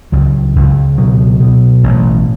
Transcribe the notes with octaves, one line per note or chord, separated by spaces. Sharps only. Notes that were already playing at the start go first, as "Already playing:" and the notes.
C#2 F#3
C#2
B2 F#3
B2
A1